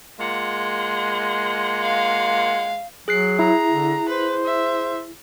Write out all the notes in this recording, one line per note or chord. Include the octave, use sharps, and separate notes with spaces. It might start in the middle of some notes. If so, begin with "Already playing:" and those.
G#3 A#3 F4 F#5
F5
F#3 G#4 F#6 C7
E4 A#5
D3
B4 C5
E5